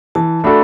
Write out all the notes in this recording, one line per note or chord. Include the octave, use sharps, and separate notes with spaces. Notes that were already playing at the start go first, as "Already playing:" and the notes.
E3 A5
A3 D4 F#4 A4 B5